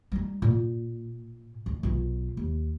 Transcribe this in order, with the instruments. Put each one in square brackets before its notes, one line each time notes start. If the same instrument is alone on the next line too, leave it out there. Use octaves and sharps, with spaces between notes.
[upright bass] G3 D#4
A#2
D2
B1 F4
D#2